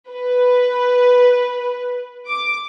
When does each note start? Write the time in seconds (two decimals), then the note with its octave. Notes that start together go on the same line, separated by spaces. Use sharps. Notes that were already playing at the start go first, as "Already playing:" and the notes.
0.11 B4
2.28 D6